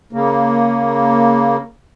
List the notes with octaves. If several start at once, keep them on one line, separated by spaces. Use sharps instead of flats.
C#3 A#3